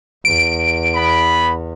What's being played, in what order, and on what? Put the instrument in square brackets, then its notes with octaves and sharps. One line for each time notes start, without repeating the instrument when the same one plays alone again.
[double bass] E2 [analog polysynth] D7
[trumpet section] B3 B5